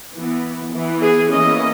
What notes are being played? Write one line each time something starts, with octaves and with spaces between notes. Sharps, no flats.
E3 B3
E3 B3
G#4
E3 A#3 C#4 D#5